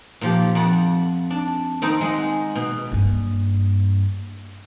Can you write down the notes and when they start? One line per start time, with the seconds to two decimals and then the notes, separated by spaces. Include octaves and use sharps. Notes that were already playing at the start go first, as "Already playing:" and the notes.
0.21 A#2 F3 G4
0.55 F2 F#5 A5
1.30 D4
1.82 D#3 C4 D#4
2.01 G#3 F#5
2.55 B2
2.92 G2 A#3